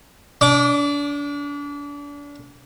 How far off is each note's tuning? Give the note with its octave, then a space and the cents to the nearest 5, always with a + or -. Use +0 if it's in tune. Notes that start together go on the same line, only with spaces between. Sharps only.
D4 -35 D6 +0